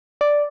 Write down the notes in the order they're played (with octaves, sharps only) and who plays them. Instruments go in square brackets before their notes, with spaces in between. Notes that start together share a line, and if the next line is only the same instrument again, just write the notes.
[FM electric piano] D5